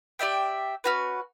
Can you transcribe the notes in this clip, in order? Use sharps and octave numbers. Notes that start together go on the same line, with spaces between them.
G4 D5 E5 G5
C#4 F#4 B4